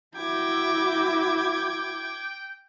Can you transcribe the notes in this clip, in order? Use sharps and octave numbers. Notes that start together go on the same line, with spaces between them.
E4 F#4 G5 D6 G#6